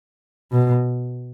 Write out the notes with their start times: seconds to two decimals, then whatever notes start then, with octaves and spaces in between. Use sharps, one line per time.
0.52 B2